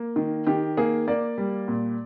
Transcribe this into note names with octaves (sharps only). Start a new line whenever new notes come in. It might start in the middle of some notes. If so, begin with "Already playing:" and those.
Already playing: A#3
D#3
D#3 G4
A#3 G#4
A#3 D5
G3
A#2